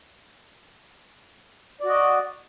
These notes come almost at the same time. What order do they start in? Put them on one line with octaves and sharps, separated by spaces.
D5 F#4 D#5